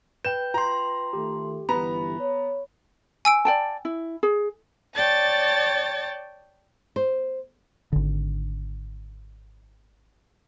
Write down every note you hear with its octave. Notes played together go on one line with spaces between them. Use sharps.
B4 G5 G6 E7
F4 A#5 C6
D#3 A3 G4
G1 E3 B3 A#5 B5
C#5
G#5 E6 D7
D5 G5 A5
E4
G#4
C#5 D5 G5 A5 A6
C5
G#1 D3